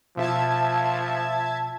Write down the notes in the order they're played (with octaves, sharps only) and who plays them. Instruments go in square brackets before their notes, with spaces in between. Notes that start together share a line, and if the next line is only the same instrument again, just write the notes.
[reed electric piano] B2 F4 [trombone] F3 [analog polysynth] E5 A5 G#6